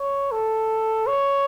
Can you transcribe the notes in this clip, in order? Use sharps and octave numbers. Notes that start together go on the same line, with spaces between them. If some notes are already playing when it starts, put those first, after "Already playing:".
Already playing: C#5
A4
C#5